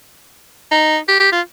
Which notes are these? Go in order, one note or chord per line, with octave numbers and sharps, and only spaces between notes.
D#4
G4
G4
F4